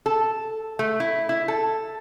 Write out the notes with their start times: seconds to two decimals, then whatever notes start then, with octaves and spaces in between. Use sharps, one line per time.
0.06 A4
0.79 A3
1.00 E4
1.29 E4
1.48 A4